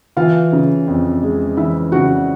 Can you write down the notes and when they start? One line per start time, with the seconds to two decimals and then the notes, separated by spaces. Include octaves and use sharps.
0.17 E3 F4 F5
0.52 C#3
0.87 F2
1.23 G#3
1.57 E3 E4 E5
1.92 C#3 F#4 F#5